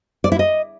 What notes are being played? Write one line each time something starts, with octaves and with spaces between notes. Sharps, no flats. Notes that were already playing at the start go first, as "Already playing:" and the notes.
D5
E4
D#5